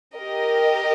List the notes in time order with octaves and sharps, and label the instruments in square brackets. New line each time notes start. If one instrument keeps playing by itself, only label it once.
[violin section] G4 A#4 D#5